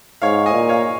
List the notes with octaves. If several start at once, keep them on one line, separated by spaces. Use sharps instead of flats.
G#2 C#5 F5
D#5 G#5
A#2
C#5 F5